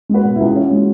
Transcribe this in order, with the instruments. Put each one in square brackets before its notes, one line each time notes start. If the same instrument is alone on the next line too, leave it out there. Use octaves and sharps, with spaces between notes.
[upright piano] G#3 F#4 B4
B2
E4
C#2
G#4
E3 C#4 F#4
G#3